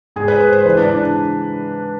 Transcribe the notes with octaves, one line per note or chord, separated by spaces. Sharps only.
G#2 G#4
B4
G#2 C5
C5
E3 B4
D4
D4